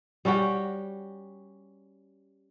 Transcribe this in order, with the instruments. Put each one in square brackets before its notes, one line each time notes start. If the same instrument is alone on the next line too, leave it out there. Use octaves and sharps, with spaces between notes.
[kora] G3 C#4 F#4 G5